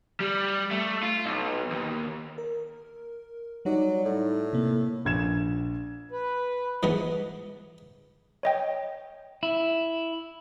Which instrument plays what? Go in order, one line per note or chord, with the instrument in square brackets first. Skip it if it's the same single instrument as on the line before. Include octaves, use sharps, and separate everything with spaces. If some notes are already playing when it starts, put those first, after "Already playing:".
[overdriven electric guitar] G3
A3
F4
B1
D#2
[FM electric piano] A#4
[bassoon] F#3 [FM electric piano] G3 D#4 D5
[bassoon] A2
[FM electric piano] C3 A#3
[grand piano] A#1 G#6 E7
[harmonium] B4
[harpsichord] G#2 E3 G#3 B3 B4
[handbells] C#5 D#5 G5
[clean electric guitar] E4